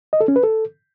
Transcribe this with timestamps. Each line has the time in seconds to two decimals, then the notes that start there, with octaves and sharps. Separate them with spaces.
0.13 D#5
0.21 A4
0.28 C#4
0.36 B4
0.43 A4